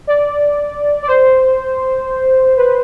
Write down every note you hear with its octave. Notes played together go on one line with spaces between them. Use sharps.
D5
D5
C5
B4